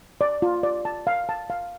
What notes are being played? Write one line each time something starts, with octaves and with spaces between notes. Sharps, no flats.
D5
F4
D5
A5
F5
A5
F5